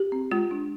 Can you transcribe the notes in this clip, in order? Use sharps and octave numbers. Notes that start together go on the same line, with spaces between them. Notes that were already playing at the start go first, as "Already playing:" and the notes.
Already playing: G4
C4
G#3 F4
D4